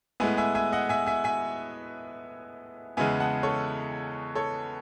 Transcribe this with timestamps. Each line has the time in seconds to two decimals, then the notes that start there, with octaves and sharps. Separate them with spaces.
0.20 A2 G#3 B3 E5 G#5
0.37 E5 G#5
0.55 E5 G#5
0.72 D#5 F#5
0.89 E5 G#5
1.06 E5 G#5
1.24 E5 G#5
2.97 E2 C#3 G#3 B3 E5 G#5
3.20 F#5 A5
3.43 A4 C#5
4.35 A4 C#5